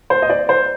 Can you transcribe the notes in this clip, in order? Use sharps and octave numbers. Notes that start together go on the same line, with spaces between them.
C5
D#5
D5
C5